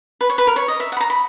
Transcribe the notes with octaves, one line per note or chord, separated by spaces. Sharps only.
B4
C#5
B4
A#4
C#5
D#5
E5
F#5
B5
A#5
B5